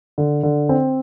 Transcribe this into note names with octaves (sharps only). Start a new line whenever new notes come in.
D3
D3
C4